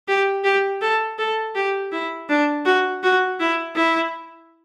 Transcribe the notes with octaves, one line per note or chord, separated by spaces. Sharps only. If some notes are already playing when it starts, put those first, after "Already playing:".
G4
G4
A4
A4
G4
E4
D4
F#4
F#4
E4
E4